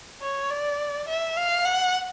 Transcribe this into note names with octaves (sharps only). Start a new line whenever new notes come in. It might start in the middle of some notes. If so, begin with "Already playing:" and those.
C#5
D5
E5
F5
F#5